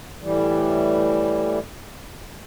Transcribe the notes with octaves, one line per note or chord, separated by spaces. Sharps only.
A2 E3 G3